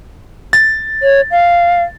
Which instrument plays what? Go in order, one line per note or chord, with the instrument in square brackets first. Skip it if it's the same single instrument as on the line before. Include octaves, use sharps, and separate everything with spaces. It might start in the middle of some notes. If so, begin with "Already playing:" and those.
[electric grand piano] A6
[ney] C#5
F5